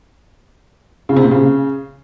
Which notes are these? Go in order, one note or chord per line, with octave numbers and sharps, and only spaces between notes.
C#3
C3
A#2
C#3